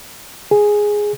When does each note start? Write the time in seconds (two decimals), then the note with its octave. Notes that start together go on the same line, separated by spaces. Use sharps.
0.51 G#4